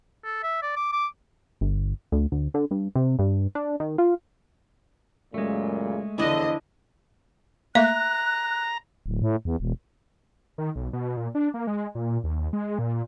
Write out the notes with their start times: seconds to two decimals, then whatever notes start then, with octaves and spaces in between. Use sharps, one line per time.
0.24 A4
0.43 E5
0.62 D5
0.76 D6
0.92 D6
1.61 G1
2.12 D2
2.32 D2
2.54 D3
2.71 G2
2.95 C3
3.19 G2
3.55 D4
3.80 D#3
3.98 F4
5.34 F#2 A#2 C#3 G#3 A3
6.18 E2 A2 D3 F3 D4 E4 D#5
7.75 A3 A#3 E5 A#5 F#6
9.06 D1
9.22 A2
9.45 E2
9.60 E1
10.58 D#3
10.76 B1
10.93 B2
11.17 A#2
11.35 D4
11.54 A#3
11.67 G#3
11.95 A#2
12.24 D#2
12.53 G#3
12.79 A#2